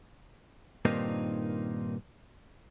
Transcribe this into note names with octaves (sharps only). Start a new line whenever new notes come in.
G2 A#2 D#3 A#3 C4 D#4